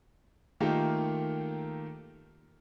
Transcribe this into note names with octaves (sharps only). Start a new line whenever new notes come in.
D#3 A3 A#3 F4 G4 A4